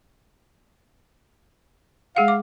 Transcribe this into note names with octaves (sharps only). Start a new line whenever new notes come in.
G#3 G#4 F5 F#5
D6